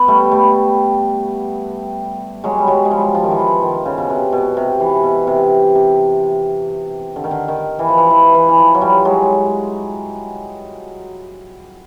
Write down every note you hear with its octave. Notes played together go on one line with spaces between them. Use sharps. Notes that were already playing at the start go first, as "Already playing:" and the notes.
Already playing: B3
G3 A3
G3 A3
F#3 G#3
G3
F#3 G#3
G#3
F3 G3
F3
D#3
E3
F3
D#3
C#3
B2
C3
B2
C3
E3
B2
C3
C3
D3
D#3
D3
D#3
E3
F3
E3
E3
E3
E3
F3
F#3
F3 G3
F#3 G#3